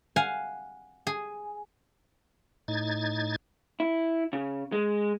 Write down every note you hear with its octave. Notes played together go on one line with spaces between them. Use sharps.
F5 F#5 G#5
G#4
A2 D#4 G#6 A6
E4
C#3
G#3